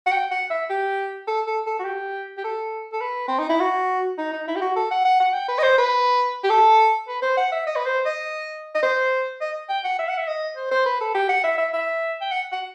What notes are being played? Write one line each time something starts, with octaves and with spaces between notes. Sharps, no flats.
F#5
G5
F#5
E5
G4
A4
A4
A4
F#4
G4
G4
A4
A4
B4
C4
D#4
E4
F#4
D#4
D#4
E4
G4
F#4
A4
F#5
F#5
F#5
G5
B4
D#5
C5
B4
G4
A4
B4
C5
F#5
E5
D#5
B4
C5
D#5
D#5
C5
D#5
G5
F#5
E5
F#5
E5
D#5
C5
C5
B4
A4
G4
F#5
E5
E5
E5
G5
F#5
F#5